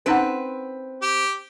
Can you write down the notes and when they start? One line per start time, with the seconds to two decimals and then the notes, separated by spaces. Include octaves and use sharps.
0.06 C4 C#4 D#4 B4 F#5
1.02 G4